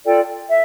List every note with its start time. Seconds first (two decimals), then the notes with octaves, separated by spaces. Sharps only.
0.05 F4 A4 D5 G5
0.50 E5